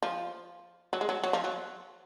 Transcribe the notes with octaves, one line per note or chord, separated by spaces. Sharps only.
F3
F#3
G#3
F#3
F#3
F3
F#3